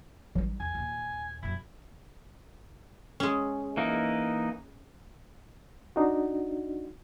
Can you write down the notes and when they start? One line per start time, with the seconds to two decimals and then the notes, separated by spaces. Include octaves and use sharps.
0.35 A1 E3 F#3 G3 D#4
0.60 E2 G#5
0.75 D#2 A#2
1.43 F#2 A#2 E4
3.20 G#3 C#4
3.77 E3 A#3 D#4
5.96 D4 D#4 F#4